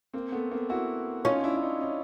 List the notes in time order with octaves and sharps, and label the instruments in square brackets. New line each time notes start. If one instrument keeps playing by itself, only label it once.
[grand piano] A#3 C4
A3 B3
A#3 C4
E4 F#4
[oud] C#4 [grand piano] D#4 F4
[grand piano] D4 E4
E4
C#4 D#4
C#4 D#4